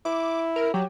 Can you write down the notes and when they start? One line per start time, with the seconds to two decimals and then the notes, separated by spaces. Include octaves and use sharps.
0.05 E4 D6
0.56 A#4
0.74 F#3 G4